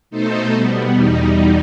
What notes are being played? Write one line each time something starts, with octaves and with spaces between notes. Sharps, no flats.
B2 A3 D#4 A4 C5
B2 G3 B3
E2 B2 G3 D#4